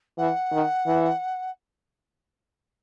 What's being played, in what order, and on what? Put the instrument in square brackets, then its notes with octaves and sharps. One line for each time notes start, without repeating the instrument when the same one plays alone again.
[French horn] E3 [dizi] F#5
[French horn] D#3
E3